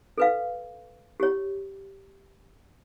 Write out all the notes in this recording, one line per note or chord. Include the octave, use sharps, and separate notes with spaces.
A4 B4 F5
G4 C#5